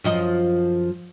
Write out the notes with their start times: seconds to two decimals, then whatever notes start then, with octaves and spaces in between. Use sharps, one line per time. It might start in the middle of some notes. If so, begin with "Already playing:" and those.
0.04 F#2 F3 D#5